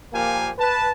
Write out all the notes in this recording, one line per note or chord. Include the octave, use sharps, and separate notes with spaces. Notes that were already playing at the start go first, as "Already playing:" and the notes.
A#2 F3 A#3 G4 F5 G#5
B4 A5